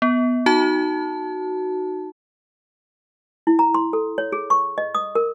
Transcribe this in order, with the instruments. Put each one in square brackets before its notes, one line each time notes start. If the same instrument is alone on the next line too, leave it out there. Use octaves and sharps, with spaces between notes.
[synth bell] B3
D#4 F#4 A5
[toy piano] E4
A#5
C6
A4
C#5
G#4
C#6
D#5
D#6
A#4